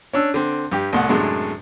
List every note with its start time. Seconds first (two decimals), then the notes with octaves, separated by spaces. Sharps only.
0.13 C#4 D4 E6
0.34 D3 C4
0.72 G2 G4
0.93 C2 A2 F#5
1.09 F#2 A2 C3 G#3 D4